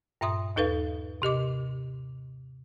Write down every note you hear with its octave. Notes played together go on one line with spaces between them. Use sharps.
G2 A#2 E5 C6 D#6
D#2 D#4 A4 B4 F5
C3 G4 D#5 D6